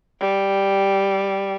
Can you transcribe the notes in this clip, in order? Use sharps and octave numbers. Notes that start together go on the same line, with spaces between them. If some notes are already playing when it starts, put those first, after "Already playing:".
G3